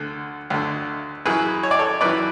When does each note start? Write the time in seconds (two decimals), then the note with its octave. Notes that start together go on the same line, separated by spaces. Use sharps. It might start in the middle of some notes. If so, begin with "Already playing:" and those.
Already playing: D2 D3
0.50 D2 D3
1.25 F#2 E3 G#4 B4
1.63 C#5
1.71 D5
1.79 A4 C#5
2.01 F#2 E3 B4 D5